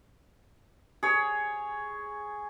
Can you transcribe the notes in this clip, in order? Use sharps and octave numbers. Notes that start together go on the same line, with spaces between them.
G#4 C#5